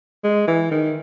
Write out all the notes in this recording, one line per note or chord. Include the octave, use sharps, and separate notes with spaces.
G#3
E3
D#3